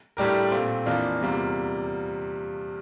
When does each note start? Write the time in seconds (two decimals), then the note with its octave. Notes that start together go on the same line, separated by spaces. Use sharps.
0.17 A2 G3 D4 G4 A#4
0.51 A#2 A3 C4
0.86 F2 E3 A#3 D4 F4
1.21 E2 C3 G3 A#3 F4